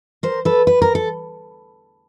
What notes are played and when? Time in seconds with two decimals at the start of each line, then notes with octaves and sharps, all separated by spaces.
0.23 A#4 C5
0.45 A4 B4
0.67 B4
0.82 A#4
0.95 A4